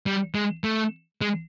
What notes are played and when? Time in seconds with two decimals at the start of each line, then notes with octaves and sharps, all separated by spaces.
0.06 G3
0.35 G#3
0.64 A3
1.21 G#3